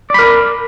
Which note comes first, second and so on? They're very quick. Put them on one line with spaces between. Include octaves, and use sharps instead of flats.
D5 B5 A#4